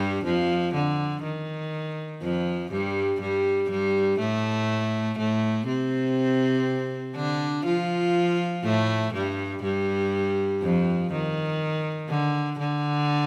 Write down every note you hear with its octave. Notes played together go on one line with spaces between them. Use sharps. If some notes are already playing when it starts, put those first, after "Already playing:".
Already playing: G2 G3
F2 F3
D3
D#3
F2 F3
G2 G3
G2 G3
G2 G3
A2 A3
A2 A3
C3 C4
D3 D4
F3 F4
A2 A3
G2 G3
G2 G3
F2 F3
D#3
D3
D3